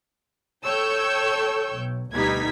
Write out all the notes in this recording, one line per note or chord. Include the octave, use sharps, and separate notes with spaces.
A4 C#5 G5 C#6 E6 G6
B1
D2 B2 G3 D#4 G#6 B6